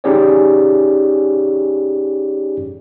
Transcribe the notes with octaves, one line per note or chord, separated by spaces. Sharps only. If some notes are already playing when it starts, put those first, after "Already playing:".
C#4 D#4 G4 G#4 C#5 D5